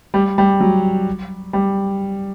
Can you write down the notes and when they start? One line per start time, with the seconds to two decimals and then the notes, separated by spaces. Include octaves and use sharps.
0.14 G3
0.38 G3
0.60 F#3
1.53 G3